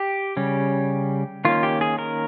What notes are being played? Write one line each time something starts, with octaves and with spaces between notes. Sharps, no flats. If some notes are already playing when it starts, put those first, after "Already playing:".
Already playing: G4
C#3 G3 C#4
D#3 A#3 C#4 F4
G4
G#4
A#4